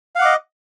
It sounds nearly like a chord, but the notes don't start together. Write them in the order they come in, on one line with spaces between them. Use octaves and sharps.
F5 F#5 D6 D#5